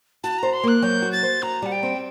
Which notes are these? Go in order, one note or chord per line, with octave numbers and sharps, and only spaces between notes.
F#4 A5
C5 A#5
C6
A#3 F#6
F#3 G6
F#4
A6
C5
F#4 A#5
G3 F#5
G5
C4